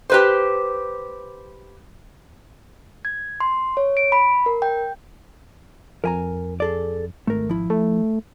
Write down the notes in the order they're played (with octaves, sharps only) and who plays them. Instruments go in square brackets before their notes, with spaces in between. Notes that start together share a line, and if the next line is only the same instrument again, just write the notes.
[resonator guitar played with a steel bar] G4 B4 C5
[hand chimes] G#6
C6
C#5
D7
B5
A#4
G5
[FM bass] F2 [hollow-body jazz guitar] A#4 G#5 A#5
[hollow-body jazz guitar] G#4 A4 D5
[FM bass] G#1 [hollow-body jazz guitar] A3 A#4
[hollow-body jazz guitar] F3 E4
[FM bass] A3